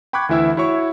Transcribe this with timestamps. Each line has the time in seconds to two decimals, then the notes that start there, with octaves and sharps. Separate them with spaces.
0.13 G5 B5 C#6 D6 F#6 G#6
0.29 D2 E3 E4 E5 E6
0.57 E4 F#4 C#5 E5 C#6